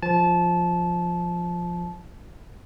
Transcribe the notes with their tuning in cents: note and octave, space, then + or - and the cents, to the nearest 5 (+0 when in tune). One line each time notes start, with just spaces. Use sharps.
F3 +0 A5 -20